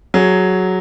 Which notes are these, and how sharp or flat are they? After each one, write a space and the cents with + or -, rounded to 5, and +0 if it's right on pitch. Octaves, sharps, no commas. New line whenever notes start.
F#3 +0 G#4 +0